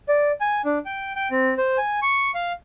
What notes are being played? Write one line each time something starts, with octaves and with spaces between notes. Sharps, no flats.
D5
G#5
D4
G5
G5
C4
C5
G#5
C#6
F5